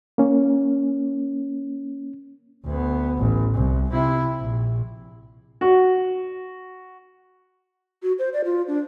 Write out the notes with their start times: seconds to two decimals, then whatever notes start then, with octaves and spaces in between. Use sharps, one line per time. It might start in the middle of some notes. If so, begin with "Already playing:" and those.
0.18 A#3 C#4
2.65 D2 B3
3.18 A1
3.55 C2
3.92 C3 E4
4.39 A#1
5.61 F#4
8.03 F#4
8.19 C5
8.33 D5
8.45 F4
8.68 D4